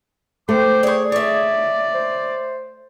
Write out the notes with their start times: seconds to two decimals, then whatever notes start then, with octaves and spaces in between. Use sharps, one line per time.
0.49 A3 C5 G5 D6
0.83 G#4 C#5 D5
1.12 C#5 D5 E5
1.94 C5